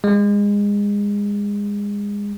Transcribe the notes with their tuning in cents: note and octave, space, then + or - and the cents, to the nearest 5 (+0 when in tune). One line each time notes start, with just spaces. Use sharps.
G#3 -25